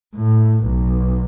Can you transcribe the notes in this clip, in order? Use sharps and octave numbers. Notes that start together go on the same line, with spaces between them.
A2
B1